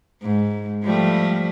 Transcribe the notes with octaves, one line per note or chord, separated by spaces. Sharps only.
G#2
F3 G3 A3